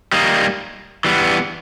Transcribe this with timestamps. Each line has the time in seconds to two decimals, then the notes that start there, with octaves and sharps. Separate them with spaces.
0.12 G3 A#3 D#4
1.05 E3 G3 B3